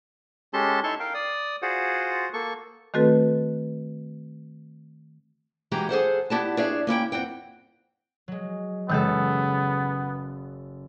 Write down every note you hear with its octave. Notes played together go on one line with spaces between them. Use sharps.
G#3 C#4 G4 A4 A5 C6
D#4 E4 A4 A5 C6 C#6
A#4 F5 G5
D5 D#6
F4 F#4 G#4 C5 F#5
A#3 A4 C#6
D#3 A3 C4 F#4 A4 B4
E3 G3 G#3 F#4 G4 A#5
G#4 A4 C5 F#5
B3 E4 G4 D5 F#5 A5
D4 G#4 C#5 D5 E5
A#3 C#4 E4 G5
F2 C4 F#5 G5
F#3 G#3
F#1 C#3 E3 G#3 B3 A4